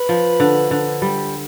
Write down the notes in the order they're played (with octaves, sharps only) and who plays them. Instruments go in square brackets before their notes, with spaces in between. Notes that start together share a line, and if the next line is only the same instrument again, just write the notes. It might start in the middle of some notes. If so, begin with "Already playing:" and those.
Already playing: [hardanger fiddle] B4
[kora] F3
D3
D3
G3